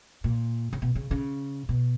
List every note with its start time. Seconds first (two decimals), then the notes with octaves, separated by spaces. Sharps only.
0.24 A#2
0.73 C#3
0.82 B2
0.95 C#3
1.11 C#3
1.69 B2